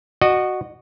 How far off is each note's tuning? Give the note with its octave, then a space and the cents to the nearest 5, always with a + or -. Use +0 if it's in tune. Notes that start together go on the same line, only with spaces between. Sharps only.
F#4 +0 D#5 -35